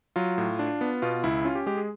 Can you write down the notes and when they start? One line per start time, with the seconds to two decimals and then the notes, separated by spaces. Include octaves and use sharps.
0.16 F#3 F4
0.38 A2
0.59 D4
0.81 B3
1.02 B2 F4
1.24 C#2 E4
1.45 C#4 F4
1.55 G4
1.66 G#3 G4
1.77 G#4